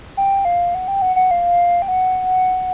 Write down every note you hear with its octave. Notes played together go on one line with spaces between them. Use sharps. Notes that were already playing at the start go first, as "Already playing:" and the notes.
G5
F5
F#5
G5
F#5
F#5
F5
G5
F#5